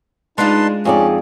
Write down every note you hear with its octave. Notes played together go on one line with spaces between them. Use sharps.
G#3 D4 D#4 F4 B4 A5 C6
F2 C#4 D#4 G#4 D5